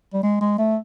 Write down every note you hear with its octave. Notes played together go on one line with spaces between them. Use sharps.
G3
G#3
G#3
A3